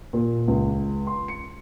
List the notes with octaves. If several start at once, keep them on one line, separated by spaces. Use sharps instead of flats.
A#2
C#2
C6
C#7